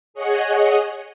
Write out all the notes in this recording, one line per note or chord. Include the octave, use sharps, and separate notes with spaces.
G#4 C#5 D#5 F#5